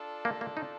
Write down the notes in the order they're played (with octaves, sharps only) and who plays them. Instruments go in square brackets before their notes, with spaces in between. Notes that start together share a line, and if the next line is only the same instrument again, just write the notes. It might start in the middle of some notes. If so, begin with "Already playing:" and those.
Already playing: [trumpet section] D4 F4 A4
[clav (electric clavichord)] A#3
A#3
D#4